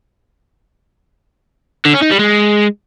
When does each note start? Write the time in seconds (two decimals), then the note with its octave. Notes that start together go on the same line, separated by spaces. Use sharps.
1.86 D3
1.94 C#4
2.03 D#4
2.11 G3
2.20 G#3